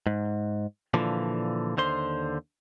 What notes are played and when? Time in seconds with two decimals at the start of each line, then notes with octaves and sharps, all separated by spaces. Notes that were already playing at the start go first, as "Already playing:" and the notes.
0.07 G#2
0.94 A#2 D3 E3 F3
1.77 D#2 D3 C5 C6